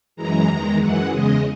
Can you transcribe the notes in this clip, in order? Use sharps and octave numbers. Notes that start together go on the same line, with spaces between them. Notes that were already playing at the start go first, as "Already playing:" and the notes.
F#2 E3 G#3 A#5
E2 D#3 G#3
F#2 E3 G#3 F#5
E2 C#3 G#3 D#5